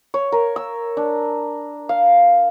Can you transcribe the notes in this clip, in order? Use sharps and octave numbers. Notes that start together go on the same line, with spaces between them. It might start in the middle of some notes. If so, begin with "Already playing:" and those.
C#5
A#4
E6
D4
F5